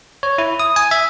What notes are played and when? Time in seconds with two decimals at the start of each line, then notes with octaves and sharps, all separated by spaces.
0.23 C#5
0.38 E4
0.60 D#6
0.76 G#5
0.91 E5